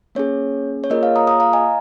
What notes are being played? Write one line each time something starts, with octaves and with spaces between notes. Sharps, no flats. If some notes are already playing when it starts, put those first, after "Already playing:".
A#3 C#4 G#4 C#5
C#5
A#3 F4 G#4 A#4 D#5
C#5 F5
A#5 D#6
A#5 D#6
F5 A#5
D#5 G#5